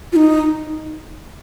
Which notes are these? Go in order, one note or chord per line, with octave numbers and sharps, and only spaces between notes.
F4
D#4